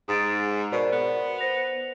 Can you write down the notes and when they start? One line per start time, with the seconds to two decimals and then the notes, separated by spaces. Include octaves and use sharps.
0.08 G#2 D#6 A6 D7
0.72 B2 A#4 C5 D5
0.92 B3
1.38 C5 A#6 F7